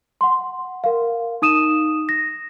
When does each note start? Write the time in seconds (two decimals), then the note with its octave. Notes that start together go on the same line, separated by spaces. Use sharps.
0.21 F#5 C6
0.84 A#4 F5
1.42 D#4 D#6 D#7 E7
2.09 A#6